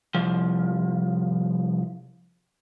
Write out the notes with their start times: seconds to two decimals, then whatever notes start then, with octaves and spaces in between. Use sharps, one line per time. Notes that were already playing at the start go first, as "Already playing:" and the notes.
0.15 C2 F3